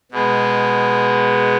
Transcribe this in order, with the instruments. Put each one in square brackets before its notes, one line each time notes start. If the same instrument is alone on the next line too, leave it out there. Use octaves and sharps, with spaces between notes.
[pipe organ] B2 G#3 B3